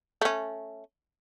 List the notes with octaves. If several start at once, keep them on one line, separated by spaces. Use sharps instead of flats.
A3 C#4